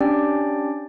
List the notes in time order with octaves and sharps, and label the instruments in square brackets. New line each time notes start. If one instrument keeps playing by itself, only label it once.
[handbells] C#4 D4 G4 D5 G5